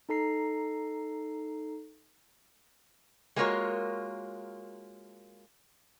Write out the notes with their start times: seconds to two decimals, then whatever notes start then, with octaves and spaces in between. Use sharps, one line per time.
0.09 D#4 A4 A#5 C7
3.36 G#3 A#3 F4 F#4 A#4 C#5